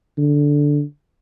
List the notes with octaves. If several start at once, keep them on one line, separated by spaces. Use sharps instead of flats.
D3